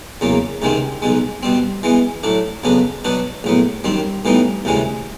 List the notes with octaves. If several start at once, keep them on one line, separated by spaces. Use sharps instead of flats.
E2 C#3 F#3 A#3
C#2 C3 D#3 G#3 C4
B1 B2 G#3
B2 G3 C4
E3 G#3 B3
A2 F#3 A3 D4
F2 C#3 F#3 B3 D4
B2 F#3 B3 D4 F#4
A#1 A2 F#3 B3
F#2 D#3 G3 C4
A2 E3 G3 B3 D#4
D2 C3 E3 G#3 C#4